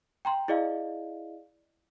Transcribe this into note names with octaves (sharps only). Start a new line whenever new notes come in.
G5 A#5 C6
E4 G#4 D5 D#5 F5